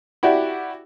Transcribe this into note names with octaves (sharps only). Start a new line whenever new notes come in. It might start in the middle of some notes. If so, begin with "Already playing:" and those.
E4 F#4 G4 D5